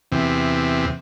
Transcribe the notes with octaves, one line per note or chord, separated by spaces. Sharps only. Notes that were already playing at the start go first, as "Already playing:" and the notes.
E2 C3